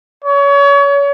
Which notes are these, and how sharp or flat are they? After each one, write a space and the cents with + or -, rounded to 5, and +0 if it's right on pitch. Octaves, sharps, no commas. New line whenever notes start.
C#5 +30